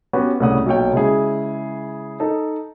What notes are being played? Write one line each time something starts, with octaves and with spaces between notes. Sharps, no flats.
B3 C#4 F#4 G4 B4
C2 A2 C#3 C#4 F#5 D#6
B1 A#2 C#5 G5
C#3 G#3 E4 G#4
D#4 A4